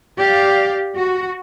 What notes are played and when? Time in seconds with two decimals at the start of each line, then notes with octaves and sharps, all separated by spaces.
0.18 G4 D5 F5
0.97 F#4